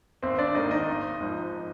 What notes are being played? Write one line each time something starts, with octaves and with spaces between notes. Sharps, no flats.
G#1 C4 C5
D4 D5
G#2 D#3 A#3 D#4 D#5
D#4 D#5
G#1
G#2 F3